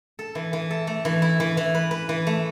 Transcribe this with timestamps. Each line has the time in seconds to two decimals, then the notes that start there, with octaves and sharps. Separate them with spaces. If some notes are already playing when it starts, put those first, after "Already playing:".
0.19 A4
0.35 E3
0.53 E3
0.71 A4
0.87 A3
1.05 E3
1.22 E4
1.40 E3
1.57 E3
1.75 B4
1.91 B4
2.09 E3
2.27 A3